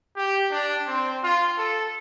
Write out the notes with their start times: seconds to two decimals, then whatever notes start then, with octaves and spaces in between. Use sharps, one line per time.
0.16 G4
0.51 D4
0.87 C4
1.23 F4
1.58 A4